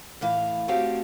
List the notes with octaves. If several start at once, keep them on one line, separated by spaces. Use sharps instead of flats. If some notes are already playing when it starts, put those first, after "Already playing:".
A2 E3 F5
A3 C4 C#4 F#4 G4 F5